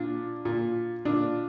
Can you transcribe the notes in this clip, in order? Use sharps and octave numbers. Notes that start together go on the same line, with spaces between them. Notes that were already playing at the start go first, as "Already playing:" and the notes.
Already playing: A#2 D4
A#2
A#2 D4